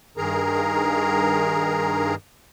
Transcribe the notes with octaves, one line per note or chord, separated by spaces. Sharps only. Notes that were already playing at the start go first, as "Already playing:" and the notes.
G2 D#3 G#4 A#4 A#5